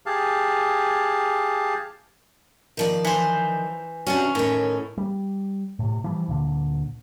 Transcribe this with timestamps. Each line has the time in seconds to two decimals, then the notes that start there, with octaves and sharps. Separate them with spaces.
0.06 G4 G#4 F5 A5
2.77 D#3 F3 D5
3.05 E3 C5
4.07 C3 C#4 D4 F#4
4.35 A2 D#3 C#4
4.97 G3
5.79 A2 C3
6.04 E3 F3 G3
6.28 D2 A#2 D3